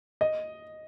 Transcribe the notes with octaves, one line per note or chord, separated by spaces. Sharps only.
D#5